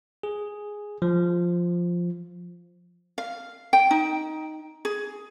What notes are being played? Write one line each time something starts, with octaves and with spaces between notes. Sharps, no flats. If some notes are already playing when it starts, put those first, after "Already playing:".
G#4
F3
F5
G5
D#4
G#4